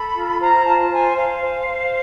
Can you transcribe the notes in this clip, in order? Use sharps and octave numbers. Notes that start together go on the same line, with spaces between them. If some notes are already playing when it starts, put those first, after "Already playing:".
Already playing: A4 B5
F4
C5 A#5
F4 A5
C5 G#5
C5 F5
C5
C5